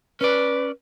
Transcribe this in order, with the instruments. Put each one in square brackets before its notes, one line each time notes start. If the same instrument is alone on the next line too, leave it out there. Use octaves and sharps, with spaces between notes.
[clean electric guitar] C#4 D5 [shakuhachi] B4